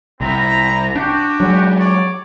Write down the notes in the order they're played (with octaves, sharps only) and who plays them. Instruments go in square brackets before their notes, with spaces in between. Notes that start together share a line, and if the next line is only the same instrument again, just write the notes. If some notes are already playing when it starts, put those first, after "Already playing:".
[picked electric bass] C2 [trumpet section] C4 A#5 B5
[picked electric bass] D4 [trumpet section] F#4 G4
[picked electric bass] F#3 G#3
[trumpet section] C#5 D5